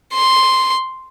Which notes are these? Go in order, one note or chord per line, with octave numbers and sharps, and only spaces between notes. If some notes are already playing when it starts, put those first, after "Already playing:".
C6